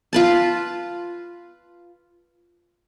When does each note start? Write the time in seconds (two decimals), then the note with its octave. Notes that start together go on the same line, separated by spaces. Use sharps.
0.13 F4 B4 A5